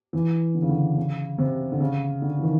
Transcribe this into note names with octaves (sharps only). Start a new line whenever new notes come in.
E3
D3
C#3
D3
C#3
C3
D3
C#3
D3
E3
D#3